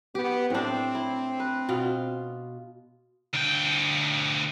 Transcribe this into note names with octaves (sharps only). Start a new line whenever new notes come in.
B3 G4
A2 C4 D4
E4
B4
B2 F4
D2 G5